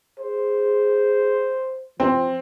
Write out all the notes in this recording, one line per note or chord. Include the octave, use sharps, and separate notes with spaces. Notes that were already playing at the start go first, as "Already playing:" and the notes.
G#4 C5
F3 C4